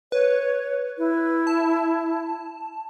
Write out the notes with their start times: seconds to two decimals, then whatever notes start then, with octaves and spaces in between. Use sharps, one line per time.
0.12 B4 C#5
0.98 E4
1.47 A5